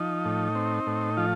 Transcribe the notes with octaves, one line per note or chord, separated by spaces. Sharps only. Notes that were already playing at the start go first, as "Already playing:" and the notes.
Already playing: F3 D#4
A2
C4
A2
F3 F4